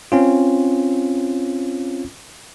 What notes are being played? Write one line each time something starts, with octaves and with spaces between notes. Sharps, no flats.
C4 C#4 F4